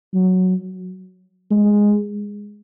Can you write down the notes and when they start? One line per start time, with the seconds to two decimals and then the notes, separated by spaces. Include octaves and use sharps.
0.14 F#3
1.51 G#3